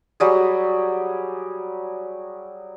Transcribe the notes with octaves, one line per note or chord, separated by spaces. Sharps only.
F#3 G3 G#4